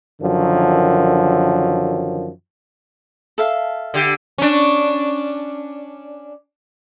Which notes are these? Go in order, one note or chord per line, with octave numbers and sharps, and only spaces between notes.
F#2 D3 D#3 F3 F#3
A4 E5 F5
D3 G4
C#4 D4